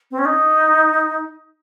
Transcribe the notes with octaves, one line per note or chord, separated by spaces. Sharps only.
C4
C#4
D#4